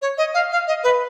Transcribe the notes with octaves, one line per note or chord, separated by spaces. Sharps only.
C#5
D#5
F5
F5
D#5
B4